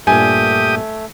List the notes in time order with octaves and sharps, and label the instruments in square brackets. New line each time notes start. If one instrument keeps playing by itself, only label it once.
[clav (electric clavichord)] G2 A#2 [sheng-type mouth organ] A3 [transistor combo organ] G4 D#6 [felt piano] G#5